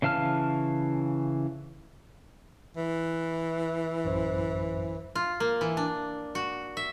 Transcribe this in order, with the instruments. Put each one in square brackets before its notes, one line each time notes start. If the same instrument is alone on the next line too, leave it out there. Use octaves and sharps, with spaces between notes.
[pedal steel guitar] C#3 E3 F5 A5 F6
[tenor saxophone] E3
[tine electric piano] A1 F#2 C5
[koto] F4
A#3
E3
D4
F#4
E5